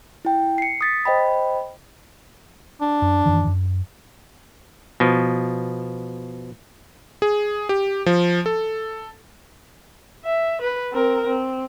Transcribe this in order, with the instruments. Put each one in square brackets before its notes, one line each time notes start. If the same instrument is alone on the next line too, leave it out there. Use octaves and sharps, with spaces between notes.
[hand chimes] E4 G5
C7 C#7
D#6 A6 B6
C5 D#5 G5 B5
[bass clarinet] D4
[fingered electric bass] F#2
F#2 D#3 E3
F#2
[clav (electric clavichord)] B2 F3
[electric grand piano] G#4
G4
F3
A4
[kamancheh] E5
B4
C4 A#4
C4